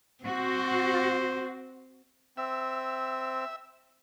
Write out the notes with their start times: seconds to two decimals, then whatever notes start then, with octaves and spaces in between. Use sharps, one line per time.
0.24 C4 F#4 C5
2.37 C4 E5